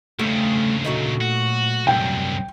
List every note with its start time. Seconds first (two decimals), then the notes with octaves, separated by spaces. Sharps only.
0.19 D2 C#3 G3 A3
0.85 A#2 F#3 A3 D#4
1.21 F#4
1.87 C2 F#2 G5